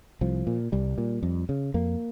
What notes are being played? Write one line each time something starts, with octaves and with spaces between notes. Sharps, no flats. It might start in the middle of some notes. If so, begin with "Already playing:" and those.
C2 F3
A#2
C2 G3
A#2
F2
C#3
F2 A#3